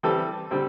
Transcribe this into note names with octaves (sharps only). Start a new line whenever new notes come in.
E3 G3 C4 A4
D3 G3 C4 A4